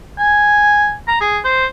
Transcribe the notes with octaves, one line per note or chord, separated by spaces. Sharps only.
G#5
A#5
G#4
C5